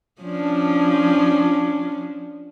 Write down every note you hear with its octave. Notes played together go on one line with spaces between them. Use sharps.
F3 C#4 D4